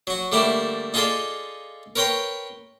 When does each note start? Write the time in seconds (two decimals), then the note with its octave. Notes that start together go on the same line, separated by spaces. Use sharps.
0.07 F#3 F#4
0.32 D3 G3 A3 A#3 E4
0.94 D#4 F4 G#4 A4 D5 C6
1.96 A#4 B4 C#5 G5 A#5 C6